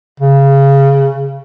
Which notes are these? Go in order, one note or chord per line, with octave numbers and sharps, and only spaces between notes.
C#3